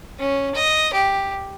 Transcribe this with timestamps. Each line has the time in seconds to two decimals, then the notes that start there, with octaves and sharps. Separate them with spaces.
0.19 C#4
0.55 D#5
0.93 G4